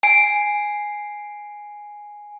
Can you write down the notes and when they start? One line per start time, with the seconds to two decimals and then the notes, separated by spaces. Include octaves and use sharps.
0.03 G#5 C7 D7